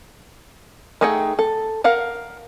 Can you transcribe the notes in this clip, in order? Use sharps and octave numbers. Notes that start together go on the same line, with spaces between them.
A3 D#4 G#4 F#5 G5
A4
A#4 F5 F#5